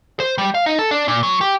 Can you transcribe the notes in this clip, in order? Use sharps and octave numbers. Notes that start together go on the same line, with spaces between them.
C5
G3
F5
D#4
A4
D4
A#2
F#3
G4